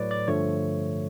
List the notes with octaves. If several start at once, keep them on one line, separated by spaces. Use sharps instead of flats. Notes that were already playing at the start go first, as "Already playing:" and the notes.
Already playing: A2 F#3 A3 B4 C#5 D5
D5
G2 D3 F3 A3 C#5